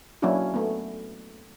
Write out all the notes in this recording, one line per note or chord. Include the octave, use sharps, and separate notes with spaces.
F#3 A#3 C#4 D4 E4 F#4
A3 B3